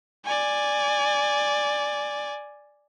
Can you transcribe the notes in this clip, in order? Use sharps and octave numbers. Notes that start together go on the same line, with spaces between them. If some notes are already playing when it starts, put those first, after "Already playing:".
D5 G#5